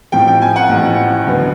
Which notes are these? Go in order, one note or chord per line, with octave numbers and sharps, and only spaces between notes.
A1 A2 F3 G5
G5
G#5
F#5
A1 A2 F3
D2 D3 F#3 B3